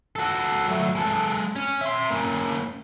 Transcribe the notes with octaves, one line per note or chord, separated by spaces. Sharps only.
F#4 A4
F#3 A3
G#3 A4
C#4
E5 C6
A#3 C#4